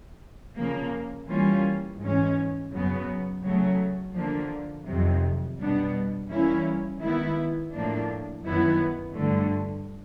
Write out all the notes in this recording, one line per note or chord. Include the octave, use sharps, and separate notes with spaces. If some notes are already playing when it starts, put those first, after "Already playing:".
C#3 F3 A#3
E3 G3 A#3 C#4 F4
G#2 E3 G#3 C#4
F#2 C#3 F#3 B3
C#3 F#3 A3
D3 F3 A#3 D4
F2 C3 D#3 F#3
B2 G3 B3 D4
E3 G3 A#3 C#4 E4
D#3 G#3 B3 E4
A2 F3 A#3 D4
F#2 D#3 F#3 B3 E4
G2 D3 F3 A3